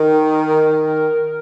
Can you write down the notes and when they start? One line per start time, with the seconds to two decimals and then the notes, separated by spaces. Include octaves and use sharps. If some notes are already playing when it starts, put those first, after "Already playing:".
Already playing: D#3 A#4
0.35 A#4